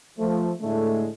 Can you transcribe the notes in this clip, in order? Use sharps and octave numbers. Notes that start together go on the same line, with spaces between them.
F3 A3
A2 D3 G#3 A3